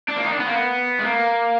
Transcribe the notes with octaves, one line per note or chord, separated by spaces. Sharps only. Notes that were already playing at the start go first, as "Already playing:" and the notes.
D4
A#3
D#4
D4
B3
A#3
B3
G#3
A#3